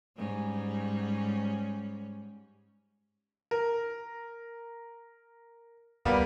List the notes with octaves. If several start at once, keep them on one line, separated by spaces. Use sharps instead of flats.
G#2 G3 C#4
A#4
D#2 G3 A#3 B3